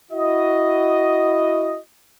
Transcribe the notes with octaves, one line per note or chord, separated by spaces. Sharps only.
E4 F#4 D#5